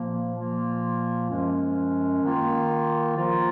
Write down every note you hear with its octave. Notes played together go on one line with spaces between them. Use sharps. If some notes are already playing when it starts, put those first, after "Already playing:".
Already playing: A#2 F3 A#3
A#2 F3 A#3 F4
F#2 F3 G#3 C#4
D#3 A#3 F4
F3 A#3 F4